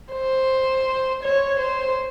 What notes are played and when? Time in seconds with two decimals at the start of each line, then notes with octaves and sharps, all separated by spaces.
0.13 C5
1.23 C#5
1.60 C5